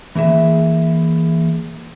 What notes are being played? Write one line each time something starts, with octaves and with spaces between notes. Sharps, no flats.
E3 A#3 G#4 E5